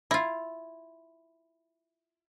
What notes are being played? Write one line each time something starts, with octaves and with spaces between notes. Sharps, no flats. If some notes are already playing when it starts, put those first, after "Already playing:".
E4 F4